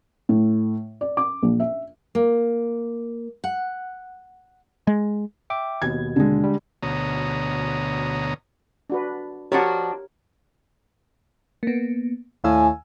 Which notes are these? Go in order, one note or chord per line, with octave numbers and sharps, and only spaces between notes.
A2
D5
D6
A#1
E5
A#3
F#5
G#3
E5 G5 D6
D#2 B2 G#6
D3 G#3
G3
D2 B2 C#5 A#5 D#6
D4 F#4 B4
F3 D4 F#4 G4 A#4 C#5
A#3 B3
D#2 A2 F5 G#5 E6